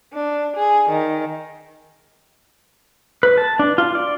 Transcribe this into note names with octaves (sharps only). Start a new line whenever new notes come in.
D4
G#4
D#3
B4
A5
D4
F4
D5